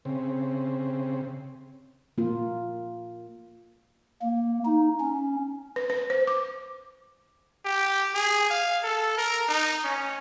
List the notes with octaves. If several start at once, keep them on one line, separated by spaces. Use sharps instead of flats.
C#3 C4
A#3 F4
A#3
D#4
C#4
B4
B4
C5
D6
G4
G#4
F5
A4
A#4
D#4
C#4